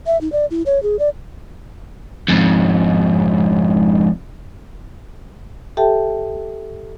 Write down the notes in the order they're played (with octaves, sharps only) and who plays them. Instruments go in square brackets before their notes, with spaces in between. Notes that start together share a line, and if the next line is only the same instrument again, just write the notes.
[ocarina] E5
D#4
D5
E4
C#5
G#4
D5
[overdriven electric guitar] F2 G#2
[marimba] G4 A4 E5 G5 A5